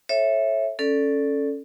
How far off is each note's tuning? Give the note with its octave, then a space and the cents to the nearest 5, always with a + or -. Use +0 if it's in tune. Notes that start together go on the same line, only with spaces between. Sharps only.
A4 +0 C#5 -25 E5 +0
C#4 -5 A4 +0 D5 +0